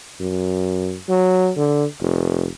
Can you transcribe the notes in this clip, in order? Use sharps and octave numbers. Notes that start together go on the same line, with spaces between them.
F#2
F#3
D3
F1